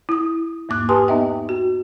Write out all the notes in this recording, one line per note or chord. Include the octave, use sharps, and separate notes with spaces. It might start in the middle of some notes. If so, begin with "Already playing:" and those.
E4 D#6
E2 G#2 A#3 D6 F#6
G4 B4 G#5 A5 C6 D#6
B3 D#4 D#5 E5 G5
F#4